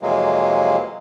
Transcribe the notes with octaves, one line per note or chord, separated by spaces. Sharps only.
F2 C3 E3 F#3 G#3 A#3